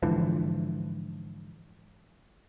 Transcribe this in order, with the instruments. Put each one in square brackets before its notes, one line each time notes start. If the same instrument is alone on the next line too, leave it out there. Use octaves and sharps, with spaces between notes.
[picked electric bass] G#2 D3 E3 F3